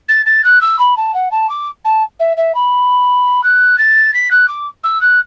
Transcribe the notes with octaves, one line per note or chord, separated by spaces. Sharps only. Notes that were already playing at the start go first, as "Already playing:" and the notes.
A6
A6
F#6
E6
B5
A5
F#5
A5
D6
A5
E5
E5
B5
F#6
A6
B6
F#6
D6
E6
F#6